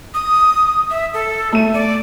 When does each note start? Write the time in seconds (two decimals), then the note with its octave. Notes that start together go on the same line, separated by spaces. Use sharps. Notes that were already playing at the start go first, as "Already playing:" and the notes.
0.14 D#6
0.90 E5
1.14 A4
1.52 A3 D#7
1.74 D5